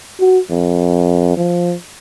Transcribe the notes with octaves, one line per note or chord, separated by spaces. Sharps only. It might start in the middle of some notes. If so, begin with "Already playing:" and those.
F#4
F2
F3